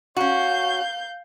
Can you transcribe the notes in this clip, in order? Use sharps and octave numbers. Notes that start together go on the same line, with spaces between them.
C#4 F#4 F5 G6